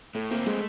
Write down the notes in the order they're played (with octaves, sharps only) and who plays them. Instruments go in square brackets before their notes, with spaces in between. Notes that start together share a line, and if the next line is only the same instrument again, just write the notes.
[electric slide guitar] A2 [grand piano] A3
[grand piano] A#3 [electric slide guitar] C4
[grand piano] G#3 [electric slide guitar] A3